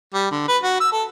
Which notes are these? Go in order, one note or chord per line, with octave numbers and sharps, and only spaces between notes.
G3
D3
B4
F#4
E6
A4